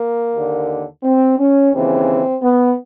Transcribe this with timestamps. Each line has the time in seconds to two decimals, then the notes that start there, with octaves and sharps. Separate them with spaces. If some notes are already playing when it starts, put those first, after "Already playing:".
Already playing: A#3
0.34 D#2 D3
1.03 C4
1.39 C#4
1.73 D#2 C#3 E3 C4
2.42 B3